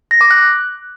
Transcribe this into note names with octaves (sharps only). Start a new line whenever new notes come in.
A#6
D6
F#6